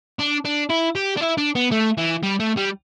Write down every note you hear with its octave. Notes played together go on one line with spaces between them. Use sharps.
D4
D4
E4
G4
D4
E4
D4
B3
A3
E3
G3
A3
G3